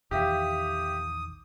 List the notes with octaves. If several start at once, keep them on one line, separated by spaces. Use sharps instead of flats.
A#1 E2 D#3 G4 E5 F5 D#6